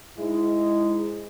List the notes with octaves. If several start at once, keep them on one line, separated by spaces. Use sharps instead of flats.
G#2 G#3 E4